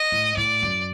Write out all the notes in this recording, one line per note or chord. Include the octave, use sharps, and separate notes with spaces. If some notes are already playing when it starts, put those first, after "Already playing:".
Already playing: D#5
A2
A2 D5
F#2